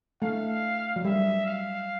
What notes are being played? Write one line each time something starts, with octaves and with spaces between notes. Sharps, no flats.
A3 F5
F#3
G3 E5
F5